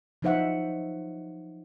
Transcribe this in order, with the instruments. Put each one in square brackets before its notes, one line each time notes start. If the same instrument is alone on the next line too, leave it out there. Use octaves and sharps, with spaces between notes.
[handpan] F3 F#3 D#4 C5 E5 F#5